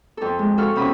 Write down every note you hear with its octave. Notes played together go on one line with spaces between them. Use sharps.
F2 A4
G#3
F#4 A4 F5 C#6 F6
E2 C3 C#4 B5 D#6